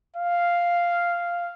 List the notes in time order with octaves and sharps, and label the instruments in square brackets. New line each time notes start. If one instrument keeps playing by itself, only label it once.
[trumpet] F5